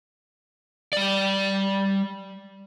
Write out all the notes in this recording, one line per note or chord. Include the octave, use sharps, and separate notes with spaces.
G3 D5